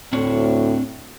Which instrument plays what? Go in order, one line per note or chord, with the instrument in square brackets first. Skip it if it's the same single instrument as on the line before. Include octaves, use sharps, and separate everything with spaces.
[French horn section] D2 A2 [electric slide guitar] C4 D4 C#5